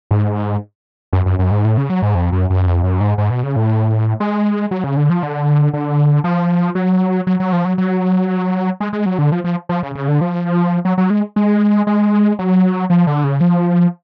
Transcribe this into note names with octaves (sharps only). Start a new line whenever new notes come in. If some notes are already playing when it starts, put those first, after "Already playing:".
G#2
F#2
F#2
F#2
G#2
A2
C#3
F#3
G#2
F2
F#2
F#2
F2
F#2
G#2
G#2
B2
C#3
A2
G#3
F#3
C#3
D3
F3
D3
D3
F3
F#3
F#3
F#3
F3
F#3
F#3
G#3
G#3
F#3
D3
F3
F3
F3
C#3
C#3
D3
F3
F#3
F#3
G#3
G#3
G#3
F#3
F3
D3
C#3
F3